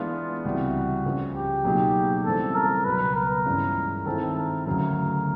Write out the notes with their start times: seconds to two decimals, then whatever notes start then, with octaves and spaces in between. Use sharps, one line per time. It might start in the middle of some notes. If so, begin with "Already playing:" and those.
Already playing: E3 G#3 B3 D4 F4
0.45 C#2 C3 E3 G3 F#4
1.05 C#2 C#3 F3
1.34 G4
1.65 B2 F#3 A#3 D#4 G#4
2.25 C#3 E3 G3 C4 A4
2.55 A#4
2.85 C#2 B2 F#3 B4
3.16 A#4
3.45 G2 E3 G#3 C#4 F4
4.05 D#3 G#3 C4 E4 A4
4.37 A#4
4.66 D2 C#3 F#3 A#4